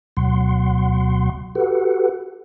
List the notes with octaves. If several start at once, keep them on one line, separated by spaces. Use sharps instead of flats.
D2 B2 F#3 F#5 C6
F#4 G4 A4 B4 F#5